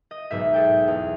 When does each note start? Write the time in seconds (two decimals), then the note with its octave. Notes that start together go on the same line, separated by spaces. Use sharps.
0.11 D#5
0.31 B1 G#2 E5
0.54 G#4 A4 G5
0.88 E2